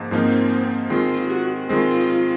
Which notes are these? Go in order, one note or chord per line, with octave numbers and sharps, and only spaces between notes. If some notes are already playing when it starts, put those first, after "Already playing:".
Already playing: G#2 F3 A#3 D#4
G#2 F3 A#3 C4 D#4
D#3 G#3 C4 F4
F#4
D#3 G#3 C4 F4